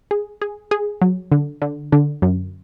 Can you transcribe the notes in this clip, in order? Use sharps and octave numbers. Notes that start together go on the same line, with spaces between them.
G#4
G#4
G#4
F#3
D3
D3
D3
F#2